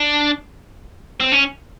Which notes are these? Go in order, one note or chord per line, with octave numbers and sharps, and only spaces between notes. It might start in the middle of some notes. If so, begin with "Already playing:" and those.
Already playing: D4
C4
C#4